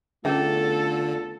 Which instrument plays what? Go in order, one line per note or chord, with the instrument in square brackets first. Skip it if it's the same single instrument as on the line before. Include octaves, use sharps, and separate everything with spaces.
[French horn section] E2 A3 F4 [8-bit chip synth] D3 [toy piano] C#4 G#4 E5 [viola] A4